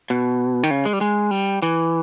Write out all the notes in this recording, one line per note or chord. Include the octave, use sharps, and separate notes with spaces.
B2
D#3
C#3
G#3
G3
G#3
G3
E3